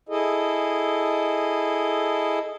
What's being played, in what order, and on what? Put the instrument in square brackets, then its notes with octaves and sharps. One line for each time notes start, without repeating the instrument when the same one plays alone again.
[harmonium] E4 G#4 A4 D#5